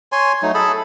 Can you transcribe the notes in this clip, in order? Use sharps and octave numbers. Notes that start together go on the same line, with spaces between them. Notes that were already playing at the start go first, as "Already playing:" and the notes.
C#5 G#5 C6
F#3 A3 D#4
G#4 A4 A5 B5